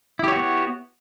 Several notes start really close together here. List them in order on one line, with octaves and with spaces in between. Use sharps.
E4 G4 C#5 F#4 B3